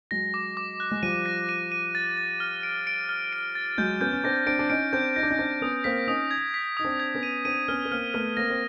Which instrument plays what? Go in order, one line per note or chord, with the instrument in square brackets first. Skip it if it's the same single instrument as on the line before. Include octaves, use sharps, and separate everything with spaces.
[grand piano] F#3 G#3 [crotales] A#6
[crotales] D6
D6
F#6
[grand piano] G#3
[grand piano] F3 G3 [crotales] D#7
[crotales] A#6
D#7
D#7
A6
A6
F6
D7
D7
F6
D7
A6
[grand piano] F#3 G#3 [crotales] G6
[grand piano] B3 C#4 [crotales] G6
[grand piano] C#4
[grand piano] C4 D4 [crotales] A#6
[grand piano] C4 D4 [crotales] D7
[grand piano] D4
[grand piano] C#4 D#4 [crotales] D7
[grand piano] C4 D4 [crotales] G6
[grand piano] D#4 [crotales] A#6
[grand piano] D4
C#4 D#4
[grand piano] C4 D4 [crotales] G6
[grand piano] B3 C#4 [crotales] D#6
[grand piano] A#3 C4 [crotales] B6
[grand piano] C#4 D#4 [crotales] D#6
[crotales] G#6
B6
[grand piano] D#4 [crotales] D#6
[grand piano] C4 D4
[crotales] G#6
[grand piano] B3 C#4
[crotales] D#7
[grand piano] C4 D4 [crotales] D#7
[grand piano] B3 C#4 [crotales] F6
[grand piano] B3
[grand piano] A#3 C4 [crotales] F6
[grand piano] A3 B3 [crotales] F6
[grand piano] A#3 C4 [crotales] A#6
[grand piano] C4